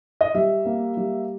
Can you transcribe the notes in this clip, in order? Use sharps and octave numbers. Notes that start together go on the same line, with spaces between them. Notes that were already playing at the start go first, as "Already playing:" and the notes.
D#5
G3 E5
A#3
G3